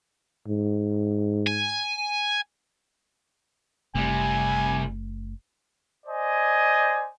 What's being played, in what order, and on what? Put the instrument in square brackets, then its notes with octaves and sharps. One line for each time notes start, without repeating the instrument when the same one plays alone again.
[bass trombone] G#2
[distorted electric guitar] G#5
[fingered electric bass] F#1 A3 [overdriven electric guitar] C3 G3 [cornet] G#5
[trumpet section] C5 D5 D#5 G#5